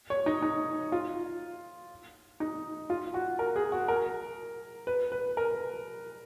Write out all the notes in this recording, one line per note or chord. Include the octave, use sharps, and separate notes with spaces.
C#5
D#4
D#4
F4
D#4
F4
F#4
A#4
G#4
F#4
A#4
B4
B4
A#4